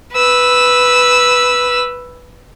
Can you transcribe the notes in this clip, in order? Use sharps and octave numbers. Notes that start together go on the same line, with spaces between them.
B4 E6